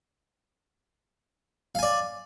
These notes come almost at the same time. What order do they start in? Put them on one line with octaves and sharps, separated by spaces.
F5 G#5 D5